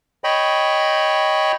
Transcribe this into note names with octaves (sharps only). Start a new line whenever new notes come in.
C#5 D#5 G5 B5